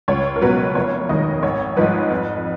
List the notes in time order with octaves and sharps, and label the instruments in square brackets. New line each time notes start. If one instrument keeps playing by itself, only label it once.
[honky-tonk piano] C#2 C#5
A#4
B2 F#3 B4
F1 C#5
D#2 D#3 G#3 D#5
G#1 C#5
G#2 F3 G#3 B4
F2